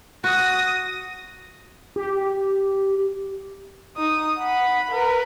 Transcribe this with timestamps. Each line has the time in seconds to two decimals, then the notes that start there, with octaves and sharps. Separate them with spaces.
0.24 F#4 D#6 A#6
1.96 G4
3.96 D#4 D#6
4.38 F#5 B5
4.91 A#4 B4